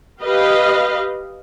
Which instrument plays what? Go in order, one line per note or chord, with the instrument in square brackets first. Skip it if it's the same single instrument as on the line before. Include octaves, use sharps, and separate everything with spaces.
[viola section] G4 B4 D#5 F5